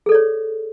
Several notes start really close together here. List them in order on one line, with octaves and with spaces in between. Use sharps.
G#4 A4 D5 C#5